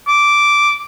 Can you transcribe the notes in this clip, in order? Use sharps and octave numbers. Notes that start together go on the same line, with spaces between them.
D6